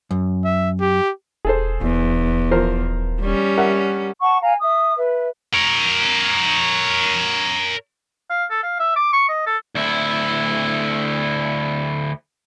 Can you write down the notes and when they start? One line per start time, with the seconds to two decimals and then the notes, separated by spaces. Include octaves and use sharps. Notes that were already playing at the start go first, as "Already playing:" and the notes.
0.11 F#2
0.44 E5
0.80 G4
1.45 E1 G#4 A4 C5
1.82 D#1 E2
2.51 F3 A#4 C5
3.21 G3 C#4
3.57 A#4 E5 F#5
4.20 F#5 A5 C#6
4.41 F5 G#5 A#5
4.61 E5 D#6
4.97 B4 E5
5.54 A#4 C#5
8.30 F5
8.50 A4
8.63 F5
8.79 E5
8.96 D6
9.13 C#6
9.28 D#5
9.46 A4
9.75 D2 E4